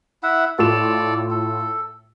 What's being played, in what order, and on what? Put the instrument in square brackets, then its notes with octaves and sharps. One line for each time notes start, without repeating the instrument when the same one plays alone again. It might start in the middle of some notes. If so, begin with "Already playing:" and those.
[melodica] E4 E5 F#5
[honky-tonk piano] A2 F4 E7 [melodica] A4 D5
[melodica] A4